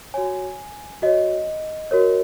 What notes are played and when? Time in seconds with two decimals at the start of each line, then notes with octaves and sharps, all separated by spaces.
0.14 F#4 C#5 G#5
1.02 F#4 C#5 D#5
1.91 F#4 A#4 C#5